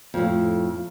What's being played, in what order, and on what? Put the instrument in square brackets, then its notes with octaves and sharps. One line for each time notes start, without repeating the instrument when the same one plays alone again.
[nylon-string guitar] F2 A2